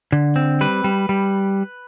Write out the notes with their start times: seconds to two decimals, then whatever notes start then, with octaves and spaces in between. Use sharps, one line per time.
0.12 D3
0.36 C4
0.61 G3 B4
0.84 G3
1.09 G3